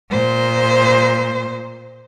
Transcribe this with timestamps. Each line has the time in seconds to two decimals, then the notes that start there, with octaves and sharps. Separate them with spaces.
0.11 A#2 C5